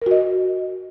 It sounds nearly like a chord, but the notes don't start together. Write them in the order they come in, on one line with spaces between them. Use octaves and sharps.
A#4 F#4 D#5